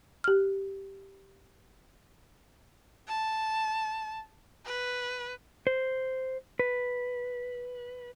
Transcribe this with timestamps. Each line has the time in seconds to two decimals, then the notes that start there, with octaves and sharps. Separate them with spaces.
0.24 G4 F6
3.08 A5
4.66 B4
5.67 C5
6.59 B4